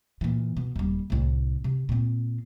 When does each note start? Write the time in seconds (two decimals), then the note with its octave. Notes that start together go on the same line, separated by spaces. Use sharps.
0.21 A#2 E3
0.57 B2
0.76 D#1 G3
1.10 C2 A2
1.64 C3
1.89 A#2 C4